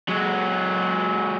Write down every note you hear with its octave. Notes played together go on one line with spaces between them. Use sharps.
F#3 G#3